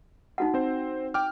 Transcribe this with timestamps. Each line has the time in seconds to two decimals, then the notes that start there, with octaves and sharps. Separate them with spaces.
0.38 D#4 F#4 F#5
0.54 C4 C5
1.14 G5 D6 F6